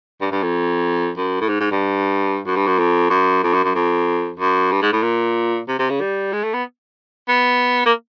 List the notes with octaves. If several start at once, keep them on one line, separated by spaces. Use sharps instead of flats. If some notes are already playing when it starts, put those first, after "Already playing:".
G2
G2
F2
F#2
A2
G#2
G#2
G2
F#2
G2
F#2
F2
F#2
F2
F#2
F#2
F2
F#2
G2
G#2
A2
A#2
C3
C3
C#3
G3
G#3
A3
B3
B3
A#3